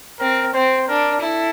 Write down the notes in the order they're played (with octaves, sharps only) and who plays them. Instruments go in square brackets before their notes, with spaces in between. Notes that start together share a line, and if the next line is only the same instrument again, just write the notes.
[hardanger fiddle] C4 [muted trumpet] A#4
[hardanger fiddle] C4 [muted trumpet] C5
[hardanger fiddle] D4 [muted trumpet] A#4
[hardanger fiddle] E4 [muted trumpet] A4